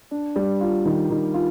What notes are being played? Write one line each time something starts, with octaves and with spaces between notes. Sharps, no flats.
D4
G3
F4
D#3
D#3
F4